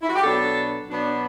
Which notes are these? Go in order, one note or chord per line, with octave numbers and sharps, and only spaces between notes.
E4
F#4
G4
B2 F#3 B3 D4 A4
B2 F#3 B3 D4